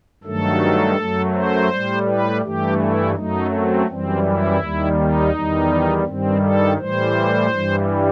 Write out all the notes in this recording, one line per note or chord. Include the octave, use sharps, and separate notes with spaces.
G2 D#3 F#3 A3 A4
F#2 F#3 A3
C5
A2 G3
B4
G2 E3 A3 G4
E4
F#2 F#3 A3 D#4
C4
F#2 E3 G3 C4
E4
D#2 D#3 G3
D#4
E2 D#3 G3
G2 D#3 G3 C4
A4
A2 E3 G3 C5
G2 E3 G3